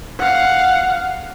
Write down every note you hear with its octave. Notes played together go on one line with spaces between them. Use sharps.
F5 F#5